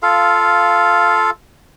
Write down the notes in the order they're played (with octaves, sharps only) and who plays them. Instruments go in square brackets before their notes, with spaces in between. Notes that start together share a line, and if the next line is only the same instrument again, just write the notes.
[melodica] F4 A4 F5